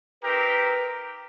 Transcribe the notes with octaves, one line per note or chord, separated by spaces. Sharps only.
C4 D#4 G4 A#4 B4